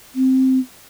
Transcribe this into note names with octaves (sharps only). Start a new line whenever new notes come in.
C4